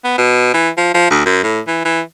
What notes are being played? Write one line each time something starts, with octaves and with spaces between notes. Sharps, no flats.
B3
B2
E3
F3
F3
D2
F#2
A2
E3
E3